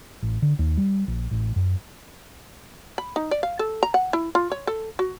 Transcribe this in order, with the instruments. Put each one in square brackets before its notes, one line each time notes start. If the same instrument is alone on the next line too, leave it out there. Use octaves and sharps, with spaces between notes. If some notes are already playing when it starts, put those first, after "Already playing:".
[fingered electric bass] A1
D3
D#2
G3
A#1
A1
F#2
[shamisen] B5
D#4
D5
F5
A4
A#5
F#5
E4
F4
C#5
A4
F#4